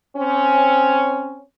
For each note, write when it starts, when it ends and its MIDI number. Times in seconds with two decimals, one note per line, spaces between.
0.16 1.43 60
0.16 1.43 61